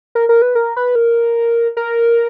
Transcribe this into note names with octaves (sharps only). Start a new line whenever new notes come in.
A#4
A#4
B4
A#4
B4
A#4
A#4